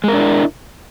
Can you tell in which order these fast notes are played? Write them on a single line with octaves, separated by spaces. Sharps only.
G#3 A#4 D4 E4